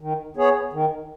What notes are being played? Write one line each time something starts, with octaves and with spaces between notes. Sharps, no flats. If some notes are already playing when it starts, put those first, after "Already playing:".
D#3
B3 G#4 C#5
D#3